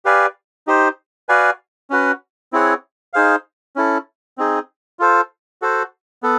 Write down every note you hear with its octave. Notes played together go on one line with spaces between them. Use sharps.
G4 B4 D5 F5 G#5
D#4 G4 C5
F#4 B4 D5 F5 G#5
C#4 F#4 B4
C4 E4 G#4 C#5 F#5
D#4 G#4 C5 F5
C#4 E4 A4
C4 D#4 G#4
F4 A4 C5
F#4 A4 C5
B3 A4